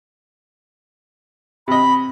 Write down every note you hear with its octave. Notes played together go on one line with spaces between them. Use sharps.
C3 D#5 B5